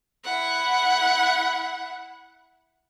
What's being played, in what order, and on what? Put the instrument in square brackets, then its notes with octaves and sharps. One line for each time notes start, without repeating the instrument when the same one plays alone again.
[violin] E4 F#5